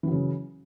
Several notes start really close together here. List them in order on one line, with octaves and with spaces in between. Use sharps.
E3 F#3 C#3